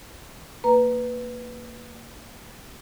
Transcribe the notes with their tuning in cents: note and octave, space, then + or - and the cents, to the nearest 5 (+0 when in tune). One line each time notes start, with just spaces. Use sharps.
A#3 -20 B4 +0 A#5 +0